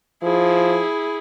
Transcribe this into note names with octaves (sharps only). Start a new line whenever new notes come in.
F3 E4 G#4